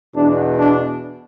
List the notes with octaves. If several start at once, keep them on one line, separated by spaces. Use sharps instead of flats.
E2 B2 D4
D4